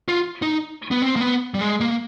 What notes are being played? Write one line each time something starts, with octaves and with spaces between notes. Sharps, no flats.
F4
D#4
B3
C4
A#3
B3
G3
G#3
A#3